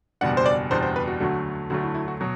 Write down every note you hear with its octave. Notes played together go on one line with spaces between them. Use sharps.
F#1 E2 B2 G3 D4 F#5
C5
D5
F#1 E2 B2 G3 D4 C5
C5
B4
F#4
D2 D3 F#3 A3 F#4
D2 D3 F#3 A3 F#4
E4
E4
F#4
B2 F#3 F#4